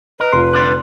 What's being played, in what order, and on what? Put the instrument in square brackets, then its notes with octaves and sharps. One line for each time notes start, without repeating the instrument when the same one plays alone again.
[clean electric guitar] A#4 [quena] B4 [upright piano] D#5
[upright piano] F1 F4 [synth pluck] C6
[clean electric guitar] D3 G3 D4 [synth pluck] C6 F#6